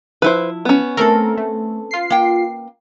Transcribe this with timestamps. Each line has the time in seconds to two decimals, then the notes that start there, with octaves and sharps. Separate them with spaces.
0.22 F3 E4 B4 C5
0.65 B3 C#4
0.97 A3 C4 A4 A#4
1.37 A3
1.91 F4 C7
2.10 A#3 G5